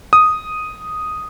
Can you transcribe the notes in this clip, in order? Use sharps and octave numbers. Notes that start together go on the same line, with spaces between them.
D#6